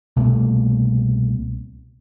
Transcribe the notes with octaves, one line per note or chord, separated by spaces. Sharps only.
C2 B2 A3 A#3